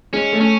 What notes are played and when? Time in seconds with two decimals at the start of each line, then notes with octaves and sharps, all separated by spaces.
0.13 G#3 C#4
0.33 A3
0.41 C#4